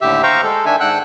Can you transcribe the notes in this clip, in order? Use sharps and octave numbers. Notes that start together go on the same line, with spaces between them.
D#2 A2 D3 G4 E5
C5 F5 G5 A#5 C#6
G#3 A4
D#3 D4 E5 G#5
G#2 D4 F#5 G5 E6 F#6